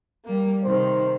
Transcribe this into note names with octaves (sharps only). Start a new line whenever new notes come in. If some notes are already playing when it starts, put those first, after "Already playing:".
G3 A#3
C3 D#3 C5